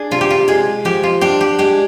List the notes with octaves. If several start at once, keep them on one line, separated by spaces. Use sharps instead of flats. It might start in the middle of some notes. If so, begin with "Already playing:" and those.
Already playing: D4 G#4
C3 F4
G4
F4
G#3 G#4
F3 G4
F4
D4 G4
G4
G#3 G4